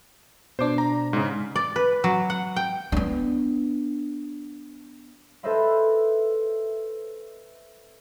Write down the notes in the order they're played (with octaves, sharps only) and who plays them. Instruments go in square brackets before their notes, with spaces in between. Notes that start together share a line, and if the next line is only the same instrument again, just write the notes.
[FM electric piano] B2 D4 [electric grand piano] C5 D6
[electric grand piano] A#5
G#2 C#3
[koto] D5
B4
F#3
F#5
G5
[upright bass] B3 D4
[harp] A4 B4 C5 D#5 E5 B5